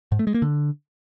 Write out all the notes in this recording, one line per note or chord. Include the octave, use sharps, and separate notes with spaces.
G#2
A3
G#3
A#3
D3